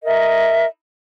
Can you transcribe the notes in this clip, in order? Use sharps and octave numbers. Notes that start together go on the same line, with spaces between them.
A#4 D#5 E5